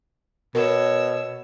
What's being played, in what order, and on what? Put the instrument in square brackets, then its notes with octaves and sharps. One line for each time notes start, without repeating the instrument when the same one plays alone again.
[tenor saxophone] B2 [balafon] A#4 [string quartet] C#5 E6